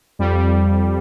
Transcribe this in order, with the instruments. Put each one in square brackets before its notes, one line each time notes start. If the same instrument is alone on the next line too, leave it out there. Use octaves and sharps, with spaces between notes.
[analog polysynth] F2 G3
G3